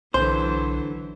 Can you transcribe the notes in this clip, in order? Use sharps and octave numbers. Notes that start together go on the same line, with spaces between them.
B1 D3 E3 F#3 C5 A5